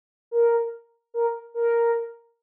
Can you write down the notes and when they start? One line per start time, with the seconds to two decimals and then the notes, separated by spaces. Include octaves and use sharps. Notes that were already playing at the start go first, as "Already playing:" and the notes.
0.31 A#4
1.14 A#4
1.54 A#4